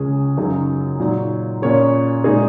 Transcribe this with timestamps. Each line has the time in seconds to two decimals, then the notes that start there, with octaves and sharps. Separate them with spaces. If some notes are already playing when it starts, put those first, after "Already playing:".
Already playing: C#2 C#3 G#3 C#4 G#4
0.37 F#2 C#3 F#3 D#4 G#4
0.99 A#2 F#3 D#4
1.62 A#2 A#3 C#4 G#4 C#5
2.24 A#2 G#3 D#4 G#4